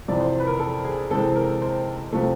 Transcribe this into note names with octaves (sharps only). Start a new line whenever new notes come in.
F2 C3 E3 D5
C5
B4
A#4
A4
G#4
C3 E3 G#3 C4 A4
A#4
C5
C3 F3 A3